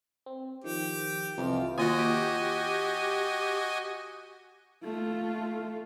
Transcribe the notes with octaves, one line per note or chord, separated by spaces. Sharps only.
C4
D#3 F3 G4
C2 F2 E3 F4
D#3 A#3 F4 F#4 D#5 G#5
G4
A3 F4